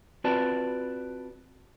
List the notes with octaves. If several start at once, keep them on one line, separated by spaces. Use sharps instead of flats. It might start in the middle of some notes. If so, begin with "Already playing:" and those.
C4 F4 F#4 B4 D5 A5